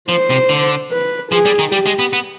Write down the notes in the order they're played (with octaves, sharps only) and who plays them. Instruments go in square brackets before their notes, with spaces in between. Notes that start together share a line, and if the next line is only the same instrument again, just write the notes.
[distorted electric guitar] F3 [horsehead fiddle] C5
[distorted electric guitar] C3
D3
[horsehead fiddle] B4
[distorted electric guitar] F3 [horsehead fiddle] G#4
[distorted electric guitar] G3
D#3
[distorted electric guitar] G3 [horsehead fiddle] G4
[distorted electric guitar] G#3
B3
B3